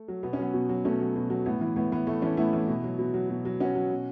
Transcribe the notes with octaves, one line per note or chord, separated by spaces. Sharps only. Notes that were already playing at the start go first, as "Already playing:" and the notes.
Already playing: A3
F#3
B2 B3
C#4
F#3 B3
B2
F#3
B2 A3 C#4
F#3
B2
F#3
A2 B3
E3
A2 B3
E3 B3
A2 A3
E3 A3 C#4
A2 B3 E4
E3
B2
F#3
B2
F#3
B2
F#3
B2 C#4 F#4
F#3
B2